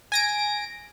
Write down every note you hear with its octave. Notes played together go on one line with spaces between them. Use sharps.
G#5 A#6 D7